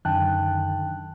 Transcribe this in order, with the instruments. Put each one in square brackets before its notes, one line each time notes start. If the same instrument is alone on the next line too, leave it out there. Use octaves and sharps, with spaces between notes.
[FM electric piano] F#2 [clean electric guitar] D3 D#3 [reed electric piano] G5 A5 F#6